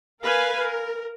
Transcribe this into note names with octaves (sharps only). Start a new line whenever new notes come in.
A#4 B4 F5 G#5
A#4